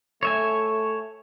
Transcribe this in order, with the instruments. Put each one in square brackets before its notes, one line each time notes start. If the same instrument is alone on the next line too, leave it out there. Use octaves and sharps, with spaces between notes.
[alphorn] A3 [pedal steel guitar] C#5 E5 G#5